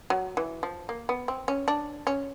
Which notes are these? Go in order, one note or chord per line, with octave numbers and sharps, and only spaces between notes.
F#3
E3
F3
A#3
B3
C4
C#4
D4
C#4